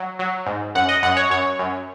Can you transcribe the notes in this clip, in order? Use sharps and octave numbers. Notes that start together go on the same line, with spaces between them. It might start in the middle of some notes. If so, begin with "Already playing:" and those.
Already playing: F#3
F#3
G#2
F#2 F#5
D#5
F#2 F#5
C#5
F#2 C#5
F#2